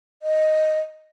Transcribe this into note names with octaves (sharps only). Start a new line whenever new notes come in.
D#5